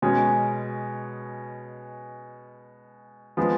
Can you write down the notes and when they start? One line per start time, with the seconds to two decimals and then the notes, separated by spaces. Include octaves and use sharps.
0.02 B2 G#3 C#4
3.37 F3 G#3 B3